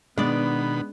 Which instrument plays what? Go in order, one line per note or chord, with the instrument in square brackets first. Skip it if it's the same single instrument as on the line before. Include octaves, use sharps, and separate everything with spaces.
[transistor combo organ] B2 D#3 B5 [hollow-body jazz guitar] G#3 D5 [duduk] B3 [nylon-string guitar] D4